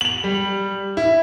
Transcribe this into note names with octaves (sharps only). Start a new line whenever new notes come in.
F7 F#7
G3
E4